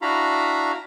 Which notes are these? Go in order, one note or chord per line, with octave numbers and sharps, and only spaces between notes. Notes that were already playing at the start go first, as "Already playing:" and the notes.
D4 E4 F#4 F5 A#5 B5